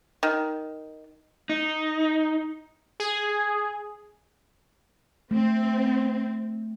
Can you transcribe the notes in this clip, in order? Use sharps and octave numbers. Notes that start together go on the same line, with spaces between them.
D#3
D#4
G#4
A3 C4